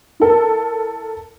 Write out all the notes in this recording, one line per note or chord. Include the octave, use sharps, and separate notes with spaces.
E4 A4 A#4